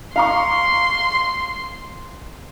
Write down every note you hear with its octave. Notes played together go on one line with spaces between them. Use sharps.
F5 A#5 C6 C#6